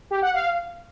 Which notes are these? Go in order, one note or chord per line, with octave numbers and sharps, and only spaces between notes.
G4
F#5
F5